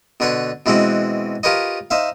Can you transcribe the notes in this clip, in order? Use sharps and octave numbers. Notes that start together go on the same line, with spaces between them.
B2 D3 B4 C#5 C6
B2 E3 G#3 C4 C#4 F#4
F4 G4 A#4 B4 C#5 D#5
D#4 C5 E5 F5